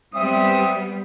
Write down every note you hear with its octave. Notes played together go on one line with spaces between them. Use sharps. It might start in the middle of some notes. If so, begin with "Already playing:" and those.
G3 B3 C4 E5 D#6